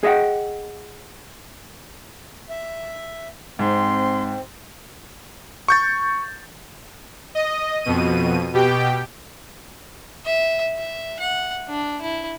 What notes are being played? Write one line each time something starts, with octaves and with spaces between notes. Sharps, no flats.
G#4 D#5 E5 F#5 G5
E5
G#2 C4 C6
C#6 G6 A6
D#5
F2 B2 D#7
B2 G4 G5
E5
E5
F#5
D4
E4